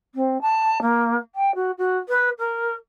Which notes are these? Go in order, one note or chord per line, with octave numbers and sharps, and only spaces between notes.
C4
A5
A#3
G5
F#4
F#4
B4
A#4